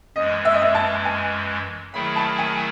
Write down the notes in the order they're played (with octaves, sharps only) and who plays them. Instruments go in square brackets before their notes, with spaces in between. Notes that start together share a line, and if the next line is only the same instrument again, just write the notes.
[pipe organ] F#2 E3 G#3 [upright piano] D#5
[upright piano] E5
D#5
E5
A5
G#5
[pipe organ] D#3 F#3 A3 E4 G#4 [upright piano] B5
[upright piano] A5
G#5